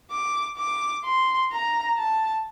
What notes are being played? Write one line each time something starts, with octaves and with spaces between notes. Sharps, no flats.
D6
D6
C6
A#5
A5